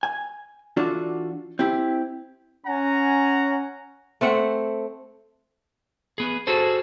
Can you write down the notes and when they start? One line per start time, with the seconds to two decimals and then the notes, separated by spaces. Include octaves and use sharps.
0.03 G#5
0.77 E3 D4 F4 F#4 A4 D5
1.59 C4 E4 G4
2.66 C#4 F#5 G#5 A#5
4.21 A3 C4 F#5
6.18 B3 G#4
6.47 F#4 G#4 A4 C5